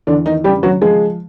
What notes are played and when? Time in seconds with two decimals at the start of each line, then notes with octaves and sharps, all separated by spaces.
0.07 E2 D3 D4
0.26 D#3 D#4
0.44 C#3 G3 G4
0.63 F#3 F#4
0.82 F3 G#3 G#4